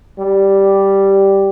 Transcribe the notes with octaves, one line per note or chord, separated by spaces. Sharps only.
G3